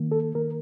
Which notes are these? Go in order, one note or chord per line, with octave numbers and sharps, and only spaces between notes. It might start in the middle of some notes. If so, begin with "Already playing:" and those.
Already playing: D#3 A#3
A4
D#3 A#3 A#4